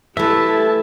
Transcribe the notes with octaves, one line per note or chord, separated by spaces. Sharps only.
E3 A3 E4 G4 E5 A5